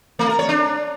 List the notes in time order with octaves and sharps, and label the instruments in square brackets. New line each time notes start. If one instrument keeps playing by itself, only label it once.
[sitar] A3
A#4
C#5
D4